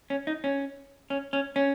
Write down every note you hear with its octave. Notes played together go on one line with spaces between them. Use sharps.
C#4
D#4
C#4
C#4
C#4
C#4